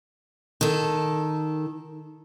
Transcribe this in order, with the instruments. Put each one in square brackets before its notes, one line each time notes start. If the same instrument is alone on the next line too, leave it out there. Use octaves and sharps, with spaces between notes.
[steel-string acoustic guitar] D#3 A4